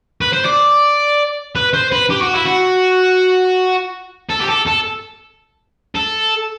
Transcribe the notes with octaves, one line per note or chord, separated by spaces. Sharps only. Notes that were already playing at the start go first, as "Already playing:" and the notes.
B4
C5
D5
B4
C5
B4
G4
F#4
E4
F#4
A4
G4
A4
A4
A4